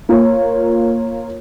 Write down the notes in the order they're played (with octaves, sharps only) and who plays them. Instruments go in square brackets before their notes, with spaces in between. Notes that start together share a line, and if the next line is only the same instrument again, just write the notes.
[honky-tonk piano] A#3 F4 A#4 C#5